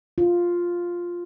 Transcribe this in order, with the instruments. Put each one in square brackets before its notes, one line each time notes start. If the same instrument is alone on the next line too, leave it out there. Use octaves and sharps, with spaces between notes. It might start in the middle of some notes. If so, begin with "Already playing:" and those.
[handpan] F4